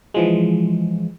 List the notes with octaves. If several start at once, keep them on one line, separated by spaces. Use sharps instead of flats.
E3 F3 G#3